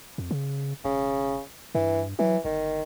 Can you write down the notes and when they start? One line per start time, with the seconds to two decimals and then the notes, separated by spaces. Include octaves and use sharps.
0.18 F2
0.31 C#3
0.85 E1 C#3
1.75 G2 E3
2.19 E3 F#3
2.45 G1 D#3